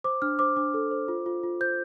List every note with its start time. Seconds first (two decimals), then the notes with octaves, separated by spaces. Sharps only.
0.04 C5 D6
0.22 D4 F6
0.39 C5 D6
0.56 D4 D6
0.74 A4
0.91 C5
1.08 F4
1.26 F4
1.43 F4
1.61 C5 G6